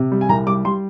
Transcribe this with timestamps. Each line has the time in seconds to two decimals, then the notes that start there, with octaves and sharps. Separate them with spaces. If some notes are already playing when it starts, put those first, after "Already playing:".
Already playing: C3
0.12 G3
0.21 G#5
0.29 C2 A#5
0.46 G3 D6
0.65 G3 C6